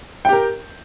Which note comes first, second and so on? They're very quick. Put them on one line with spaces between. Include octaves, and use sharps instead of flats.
G5 G4 A#4